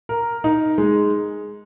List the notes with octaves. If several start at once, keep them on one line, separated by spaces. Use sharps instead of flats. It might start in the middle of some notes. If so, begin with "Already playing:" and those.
A#4
D#4
G#3